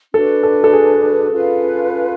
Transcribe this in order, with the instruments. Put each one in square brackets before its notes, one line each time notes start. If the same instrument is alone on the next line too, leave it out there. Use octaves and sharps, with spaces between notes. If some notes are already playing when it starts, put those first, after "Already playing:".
[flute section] D4 F#4 B4 [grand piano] A4
[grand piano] A4
A4
G#4
[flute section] C#4 F4 B4 F5